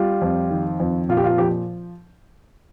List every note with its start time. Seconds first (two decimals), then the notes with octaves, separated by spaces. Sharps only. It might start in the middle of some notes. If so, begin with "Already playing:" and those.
Already playing: G3 F4
0.22 F2
0.51 D#3
0.80 F2
1.09 A#2 F4
1.17 G4
1.24 F4
1.38 F3 G4